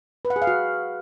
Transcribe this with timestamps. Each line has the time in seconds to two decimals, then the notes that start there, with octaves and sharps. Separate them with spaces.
0.25 B4
0.30 F#5
0.36 G#4
0.42 F5
0.47 F#4